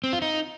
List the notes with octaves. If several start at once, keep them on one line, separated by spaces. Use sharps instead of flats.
C4
F4
D#4